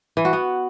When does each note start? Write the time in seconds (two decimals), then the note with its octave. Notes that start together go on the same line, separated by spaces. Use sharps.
0.17 E3
0.25 F#4
0.33 B3